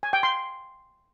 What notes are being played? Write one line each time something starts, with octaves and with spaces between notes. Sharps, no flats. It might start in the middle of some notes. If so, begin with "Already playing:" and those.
G#5
G5
C6